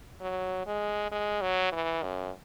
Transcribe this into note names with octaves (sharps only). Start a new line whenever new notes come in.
F#3
G#3
G#3
F#3
E3
F#2